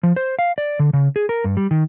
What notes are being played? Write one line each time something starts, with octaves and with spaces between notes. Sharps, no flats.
F3
C5
F5
D5
D3
C#3
G#4
A#4
G2
G3
D#3